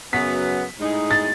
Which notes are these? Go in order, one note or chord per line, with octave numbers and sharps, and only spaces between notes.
F#2 C#3 F#3 B3 B6
A2 G#3 D#4 G#4
A6